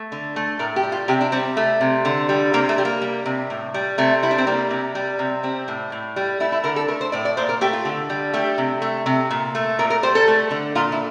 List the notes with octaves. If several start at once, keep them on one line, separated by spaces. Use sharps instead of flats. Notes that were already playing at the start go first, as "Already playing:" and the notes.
Already playing: A3
D3
A3
A2 A#4
G4
G3
F4
C3 G4
D4
G3 C4
A3
C3
D3
G3
C3 A#3
A3
G3
A#3
G3
C3
A2
G3
C3 A3
G3 E4
D4
C4
G3 A#3
C3
G3
C3
G3 C4
A2
A2
G3
A3 E4
E4
D3 A#4
A4
A3 A#4
C5
A2 D5
D5
A#2 C5
A#4
A3 G4
F4
D3
G3
A3 G4
C3
A3
C3
A#2
A3
A#2 A#4
A#4
G3 C5
A4
A3
D3
A#2 F4
E4